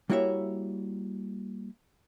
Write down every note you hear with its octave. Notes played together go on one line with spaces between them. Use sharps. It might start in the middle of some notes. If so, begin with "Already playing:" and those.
G3 A#3 E4 F#4 C#5 E5